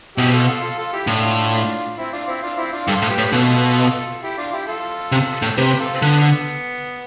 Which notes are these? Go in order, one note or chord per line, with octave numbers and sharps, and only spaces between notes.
B2 E4 G4
F4 A4
F4 A4
F4 A4
F4 A4
E4 G4
A2 D4 F4
C4 E4
D4 F4
C4 E4
D4 F4
C4 E4
D4 F4
G2 F4 A4
A2
G4 B4
A2
B2 F4 A4
E4 G4
D4 F4
E4 G4
F4 A4
C3
A2
A4
C3 G4 B4
F4 A4
C4
D3 B3